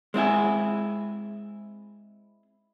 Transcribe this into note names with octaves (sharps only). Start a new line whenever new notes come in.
G#3 C4 E4 G#4